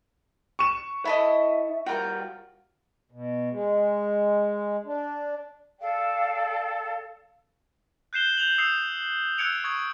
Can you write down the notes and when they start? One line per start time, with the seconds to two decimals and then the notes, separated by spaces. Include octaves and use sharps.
0.59 C#6 E7
1.05 E4 A4 D#5 E5
1.86 G3 F4 F#4 A#4 G5
3.12 B2
3.51 G#3
4.86 D4
5.79 A4 D5 F5 G5
8.13 F#6 G6 C7 E7 G7
8.38 G6 F7 F#7
8.58 D#6 E6 G6 C7 F7
9.38 E6 F#6 G#6 C#7 D7 F7
9.64 C#6 D#6 G#6